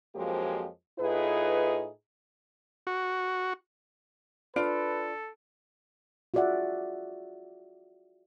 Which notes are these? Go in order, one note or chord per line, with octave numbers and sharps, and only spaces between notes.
F2 F3 F#3 G#3 A#3 G4
A2 D#4 F4 G#4 B4
F#4
D4 F4 A4 B4 D7
F4 F#4 G#4 D5 E5 F#5